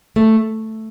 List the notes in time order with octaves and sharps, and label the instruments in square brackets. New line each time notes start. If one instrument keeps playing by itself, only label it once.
[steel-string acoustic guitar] A3